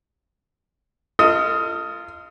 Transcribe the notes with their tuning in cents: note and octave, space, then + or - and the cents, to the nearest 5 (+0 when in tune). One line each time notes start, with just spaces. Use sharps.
F4 -20 A4 +40 D#5 +15